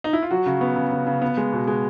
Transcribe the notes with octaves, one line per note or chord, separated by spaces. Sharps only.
D#4
E4
F4
F#3 F#4
C#3
B3
C#3
C#3
C#3
B3
G#3
B2
G#3